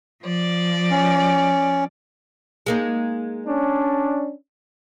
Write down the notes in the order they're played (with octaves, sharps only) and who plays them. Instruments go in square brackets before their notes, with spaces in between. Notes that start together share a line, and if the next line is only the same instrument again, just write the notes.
[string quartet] F3 D5
[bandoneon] C#4
[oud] G#3 A#3 D#4
[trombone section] C#4 D4